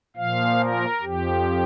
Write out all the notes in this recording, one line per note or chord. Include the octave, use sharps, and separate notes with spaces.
A#2 F3 F5
A#4
F2 F3 G4